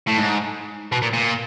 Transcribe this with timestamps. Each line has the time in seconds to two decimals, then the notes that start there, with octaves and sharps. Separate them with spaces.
0.07 A2
0.18 G#2
0.92 B2
1.02 A#2
1.14 A#2